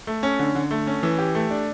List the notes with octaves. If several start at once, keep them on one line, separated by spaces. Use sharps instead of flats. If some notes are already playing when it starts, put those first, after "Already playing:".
A3
C#4
D3
D3
A3
C#4
E3
G4
A3
D4